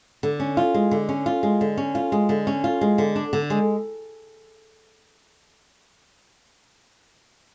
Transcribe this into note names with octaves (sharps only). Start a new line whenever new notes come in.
D3
C#4
F4
G#3
D3
C#4
F4
G#3
D3
C#4
F4
G#3
D3
C#4
F4
G#3
D3
D4
D3
G#3